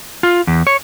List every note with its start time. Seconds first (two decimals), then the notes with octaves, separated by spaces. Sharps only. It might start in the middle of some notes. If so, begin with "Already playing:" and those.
0.23 F4
0.47 E2
0.67 C#5